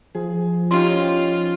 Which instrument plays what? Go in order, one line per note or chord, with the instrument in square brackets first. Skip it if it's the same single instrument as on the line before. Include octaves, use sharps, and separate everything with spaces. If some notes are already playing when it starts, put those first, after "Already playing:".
[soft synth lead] F3 [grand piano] G#4
[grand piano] C#4 D#4 G4 [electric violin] F4 [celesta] C6